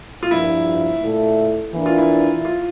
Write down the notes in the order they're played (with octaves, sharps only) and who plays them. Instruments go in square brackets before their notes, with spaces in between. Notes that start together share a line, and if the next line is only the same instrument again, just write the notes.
[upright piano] F4
[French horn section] G2 F3 A#3 [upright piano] E4
[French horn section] A#2 A3 E4 A4
E3 A#3 D4
[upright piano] F4
E4
F4